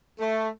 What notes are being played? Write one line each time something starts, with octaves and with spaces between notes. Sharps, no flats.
A3